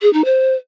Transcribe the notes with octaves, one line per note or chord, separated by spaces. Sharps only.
G#4
D#4
C5